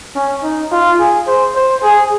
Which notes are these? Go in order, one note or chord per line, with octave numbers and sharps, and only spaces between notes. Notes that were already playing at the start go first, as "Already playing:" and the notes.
C#4
D#4
F4
G#4
C5
C5
G#4